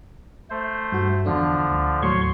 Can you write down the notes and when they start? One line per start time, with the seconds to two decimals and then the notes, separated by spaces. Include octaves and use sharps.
0.50 A3 C5
0.92 G2 F#4
1.26 E2 D3 F3 D4
1.71 D2
2.02 D#2 A2 F#3 C#5 C6 C#6